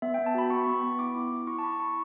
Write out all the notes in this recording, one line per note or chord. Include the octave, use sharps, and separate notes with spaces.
B3 E5
B3 G5
A5
F#4 B5
B3 C#6
B3
B3
E4 D6
E4
E4
E4 C#6
A5
E4 B5
E4 C#6